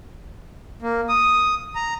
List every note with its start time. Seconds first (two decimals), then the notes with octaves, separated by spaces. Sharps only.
0.82 A#3
1.09 D#6
1.75 A#5